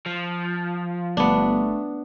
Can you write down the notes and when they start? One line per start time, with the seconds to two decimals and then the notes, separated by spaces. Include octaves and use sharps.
0.06 F3
1.17 G1 A3 B3 D4